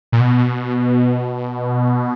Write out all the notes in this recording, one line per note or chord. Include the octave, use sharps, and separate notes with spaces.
A#2
B2